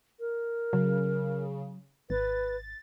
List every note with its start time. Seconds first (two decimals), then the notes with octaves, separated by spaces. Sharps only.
0.20 A#4
0.73 C#3 F#3
2.10 G#1 B4 A6